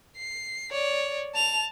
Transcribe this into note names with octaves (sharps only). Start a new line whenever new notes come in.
C7
C#5 D5
A5 F7